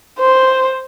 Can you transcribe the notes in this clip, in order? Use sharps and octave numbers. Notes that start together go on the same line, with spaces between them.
C5